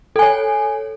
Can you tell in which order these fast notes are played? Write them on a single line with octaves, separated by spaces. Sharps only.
A4 G#5 C#5